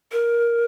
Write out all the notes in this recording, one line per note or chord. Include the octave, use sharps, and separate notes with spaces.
A#4